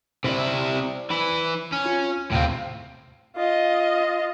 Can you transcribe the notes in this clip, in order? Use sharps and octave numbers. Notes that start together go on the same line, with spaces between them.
C3 E4 C5 D5
E3 E4
C#4
F4
D#2 A2 C3 C4 F5
F4 D#5